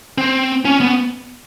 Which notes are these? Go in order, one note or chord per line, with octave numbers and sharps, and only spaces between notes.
C4
C#4
B3